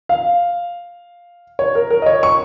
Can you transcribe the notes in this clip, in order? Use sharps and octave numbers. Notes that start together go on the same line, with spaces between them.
F5
C#5
A#4
A#4
D#5
C#5
C#6